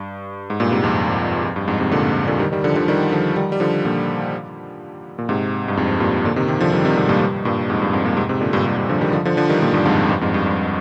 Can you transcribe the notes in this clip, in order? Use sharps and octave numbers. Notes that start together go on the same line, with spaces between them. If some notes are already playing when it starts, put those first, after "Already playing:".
Already playing: G2
G#2
G2 A#2
G#2 C3
F2 G#2
F2
G2
F2 G#2
G#2 C3
A#2 D3
F2 G#2
A#2 D3
D#3 G3
D#3 G3
D3 F3
D3 F3
D#3 G3
D3 F3
D#3 G3
G3
D3 F3
A#2 D3
A#2
G#2 C3
G2
F2 G#2
G2 A#2
A#2 D3
C3 D#3
C3 D#3
D3 F3
D#3 G3
C3 D#3
G#2 C3
G2 A#2
G2
G2 A#2
F2 G#2
G2
F2 G#2
G2 A#2
G#2 C3
G#2 C3
A#2 D3
G2 A#2
G2
G2
D3 F3
D#3 G3
D3 F3
D3 F3
D3 F3
D#3 G3
A#2 D3
G2 A#2
F2 G#2
G2
F2 G#2
G2
G2